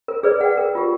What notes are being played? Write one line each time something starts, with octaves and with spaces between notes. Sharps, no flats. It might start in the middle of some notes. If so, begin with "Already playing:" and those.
A#4
G#4 B4 D5
F#5 G5
A#4
F4 G4